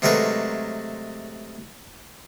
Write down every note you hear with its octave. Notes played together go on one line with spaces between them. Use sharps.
C3 F#3 G#3 A3 A#4 B4